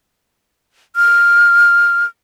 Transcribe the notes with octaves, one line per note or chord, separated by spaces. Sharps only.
F6